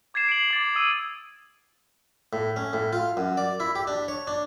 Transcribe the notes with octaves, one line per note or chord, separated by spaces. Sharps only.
D6 G#6 A6 C7 E7
D7 F#7
D6 A6
D#6 E6 D#7
A2
C#4
A2
F4
F#2
D5
E4
G4
D4
C#5
D4